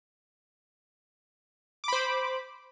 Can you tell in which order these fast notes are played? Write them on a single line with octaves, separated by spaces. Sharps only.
D6 B5 C5